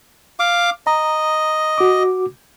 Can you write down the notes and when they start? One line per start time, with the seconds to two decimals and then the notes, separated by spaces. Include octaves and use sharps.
0.39 F5 D6
0.87 D#5 A#5
1.78 F#4 D6